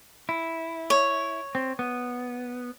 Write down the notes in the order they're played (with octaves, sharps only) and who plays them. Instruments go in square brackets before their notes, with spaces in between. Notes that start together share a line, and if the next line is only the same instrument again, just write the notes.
[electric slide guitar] E4
[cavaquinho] C#5
[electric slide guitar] C4
B3